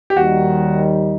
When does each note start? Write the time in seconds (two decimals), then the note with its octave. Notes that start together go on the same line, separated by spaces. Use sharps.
0.10 G4
0.17 D#2 D#3 G3 D#4 F#4